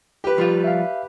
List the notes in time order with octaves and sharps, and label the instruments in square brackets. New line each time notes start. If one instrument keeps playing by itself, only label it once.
[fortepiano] G4 B4
[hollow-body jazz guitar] F3 G3 F4
[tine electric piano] E5 F5